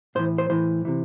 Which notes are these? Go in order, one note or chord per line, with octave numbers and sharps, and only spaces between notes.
A2 E3 C5
C5
A2 E3 C5
C3 E3